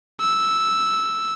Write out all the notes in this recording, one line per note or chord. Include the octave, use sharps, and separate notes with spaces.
E6